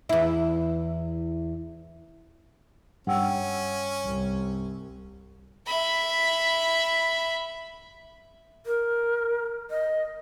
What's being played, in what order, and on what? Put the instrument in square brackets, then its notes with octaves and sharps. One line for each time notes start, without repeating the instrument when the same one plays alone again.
[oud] E2 E4
[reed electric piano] G2 [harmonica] C#4 [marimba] F#5 G5 E6
[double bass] C2
[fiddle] E5 B5
[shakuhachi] A#4
D#5